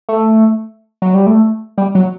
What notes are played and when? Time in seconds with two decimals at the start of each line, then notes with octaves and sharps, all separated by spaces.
0.09 A3
1.02 F#3
1.14 G3
1.27 A3
1.78 G3
1.95 F#3